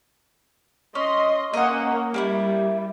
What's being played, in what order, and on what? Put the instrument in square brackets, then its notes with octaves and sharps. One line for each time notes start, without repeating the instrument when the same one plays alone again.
[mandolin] C#4 [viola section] D#5 C6
[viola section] A#3 C#4 [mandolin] D#5 F#5
[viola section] G3 [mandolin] A#3 D4 E4